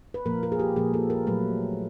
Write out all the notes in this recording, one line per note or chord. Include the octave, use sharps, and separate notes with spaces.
B4
A#2 F3 A#3 A#4
A#4
G#4
G4
A#2 F3 A#3 G#4
A4
A#4
A#2 F#3 A3 B4